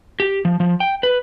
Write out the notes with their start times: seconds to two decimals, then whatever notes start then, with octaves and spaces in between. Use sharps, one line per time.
0.20 G4
0.45 F3
0.60 F3
0.80 G5
1.03 B4